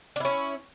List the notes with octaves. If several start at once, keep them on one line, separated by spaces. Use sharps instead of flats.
C#4 D4 E4